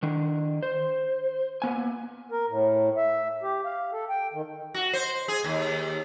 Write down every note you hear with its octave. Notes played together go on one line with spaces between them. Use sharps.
D#3 D4
C5
A#3 B3 G#5
A#4
A2
E5
G4
F5
A4
G5
D#3
F#4
C5
G#4
D#2